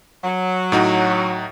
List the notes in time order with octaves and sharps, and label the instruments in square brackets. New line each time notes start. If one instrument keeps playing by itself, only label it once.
[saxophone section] F#3
[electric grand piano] A2 D#4 F#4